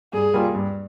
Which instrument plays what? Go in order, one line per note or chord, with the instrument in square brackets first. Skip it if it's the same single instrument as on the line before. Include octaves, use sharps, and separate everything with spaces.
[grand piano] G2 [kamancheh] G#4
[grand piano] G3 A#3 F4 A#4
G2